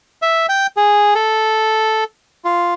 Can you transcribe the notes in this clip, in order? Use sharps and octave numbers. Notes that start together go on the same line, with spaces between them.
E5
G5
G#4
A4
F4